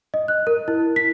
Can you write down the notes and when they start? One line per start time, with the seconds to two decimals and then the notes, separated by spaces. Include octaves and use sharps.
0.14 D#5
0.28 F#6
0.47 A#4
0.68 E4
0.96 B6